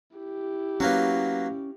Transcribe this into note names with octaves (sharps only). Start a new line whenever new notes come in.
E4 G4
F#3 A#3 B3 C#4